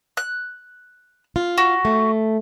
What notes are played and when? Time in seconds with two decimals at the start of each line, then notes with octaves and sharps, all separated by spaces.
0.17 F#6
1.36 F4
1.58 F#4
1.85 A3